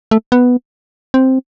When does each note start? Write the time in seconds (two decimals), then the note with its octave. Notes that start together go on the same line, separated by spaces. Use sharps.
0.11 A3
0.32 B3
1.14 C4